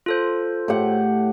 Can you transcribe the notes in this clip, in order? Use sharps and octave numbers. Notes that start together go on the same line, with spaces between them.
F4 A4 C5
A2 G4 F#5